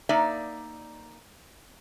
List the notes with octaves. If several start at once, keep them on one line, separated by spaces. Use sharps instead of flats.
A#3 D#4 D5 E5